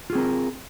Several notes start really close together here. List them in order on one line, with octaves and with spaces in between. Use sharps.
F4 G#4 C4 A#4